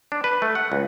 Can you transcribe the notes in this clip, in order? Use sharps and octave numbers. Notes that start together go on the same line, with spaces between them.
D4
B4
A3
F#5
C#2